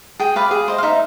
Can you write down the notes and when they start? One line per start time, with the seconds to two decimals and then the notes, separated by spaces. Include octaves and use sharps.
0.20 G#4 G5
0.36 B4 D5 F5
0.51 G#4
0.68 C5 D#5
0.78 F5
0.83 D#4 E5